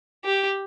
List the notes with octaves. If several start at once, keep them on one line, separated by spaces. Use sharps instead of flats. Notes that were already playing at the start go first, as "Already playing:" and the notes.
G4